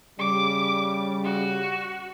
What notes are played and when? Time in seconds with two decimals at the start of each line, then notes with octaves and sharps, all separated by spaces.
0.19 C#3 G3 D6
1.24 F#4